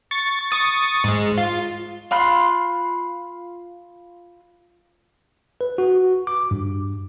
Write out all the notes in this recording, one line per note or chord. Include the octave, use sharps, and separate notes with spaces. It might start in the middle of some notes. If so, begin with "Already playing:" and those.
C#6 A6
C#6 D#6 A6
G#2 G#3
F4
F4 B5 C6 F#6
B4
F#4
D6
G2